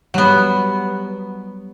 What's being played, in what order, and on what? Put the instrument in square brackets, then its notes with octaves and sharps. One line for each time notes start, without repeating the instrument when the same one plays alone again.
[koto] F#3 B3 [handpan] G3 F#5